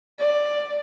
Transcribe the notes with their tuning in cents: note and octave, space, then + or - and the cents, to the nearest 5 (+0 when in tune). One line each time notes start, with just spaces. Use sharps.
D5 +10